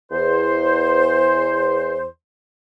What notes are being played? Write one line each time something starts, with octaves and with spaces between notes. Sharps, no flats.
E2 C5